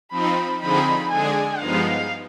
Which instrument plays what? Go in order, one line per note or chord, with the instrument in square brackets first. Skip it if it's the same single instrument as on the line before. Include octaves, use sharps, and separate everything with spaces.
[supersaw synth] F3 C4 D#4 [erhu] B5
[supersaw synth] D3 F3 C4 D#4 G#4 [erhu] B5
[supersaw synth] D3 G#3 D4 G#4 [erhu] G#5
[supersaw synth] G2 F3 G#3 B3 D#4 [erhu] F5